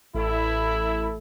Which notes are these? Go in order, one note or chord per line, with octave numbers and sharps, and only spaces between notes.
A1 E4 A4